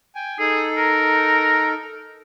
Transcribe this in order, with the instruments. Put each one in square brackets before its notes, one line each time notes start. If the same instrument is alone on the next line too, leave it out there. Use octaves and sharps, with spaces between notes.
[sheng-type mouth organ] G5 G#5
[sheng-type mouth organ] D#4 A4 [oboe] G#4
[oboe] A#4